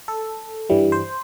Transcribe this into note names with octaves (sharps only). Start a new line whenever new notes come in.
A4
G2 E3 G3
C5